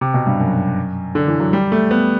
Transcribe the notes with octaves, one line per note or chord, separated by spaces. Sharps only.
C3
B2
G2
F#2
D3
E3
F#3
G3
A3
B3